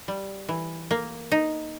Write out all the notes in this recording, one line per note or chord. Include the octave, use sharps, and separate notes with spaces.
G3
E3
A#3
D#4